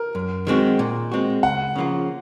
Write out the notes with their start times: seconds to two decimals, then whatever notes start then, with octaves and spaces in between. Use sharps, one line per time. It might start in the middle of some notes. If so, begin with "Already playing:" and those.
Already playing: A#4
0.15 F#2
0.47 D#3 G#3 C4 F#4
0.79 A#2
1.12 G#3 C4 F#4
1.43 C#2 F#5
1.76 C#3 F3 A#3 F4